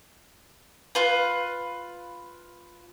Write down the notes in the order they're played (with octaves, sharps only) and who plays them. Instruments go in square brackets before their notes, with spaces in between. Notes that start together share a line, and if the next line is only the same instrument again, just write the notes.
[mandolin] F4 B4